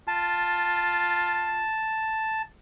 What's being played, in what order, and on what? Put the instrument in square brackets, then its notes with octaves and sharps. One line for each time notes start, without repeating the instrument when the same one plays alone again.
[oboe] F4 [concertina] A5